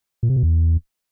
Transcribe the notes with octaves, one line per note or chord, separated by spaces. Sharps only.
A#2
C3
B2
E2